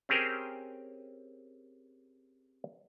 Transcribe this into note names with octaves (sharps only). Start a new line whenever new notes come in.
C4 C#4 G4 G#4 A#4 C5